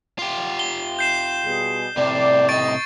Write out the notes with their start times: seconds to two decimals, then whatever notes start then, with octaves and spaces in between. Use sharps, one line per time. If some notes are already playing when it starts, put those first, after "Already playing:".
0.19 F4 G4
0.59 G7
0.99 G6 C7 E7
1.45 B2 G3 G#4
1.97 A2 C3 D5
2.49 D#5 C#6 A6 D7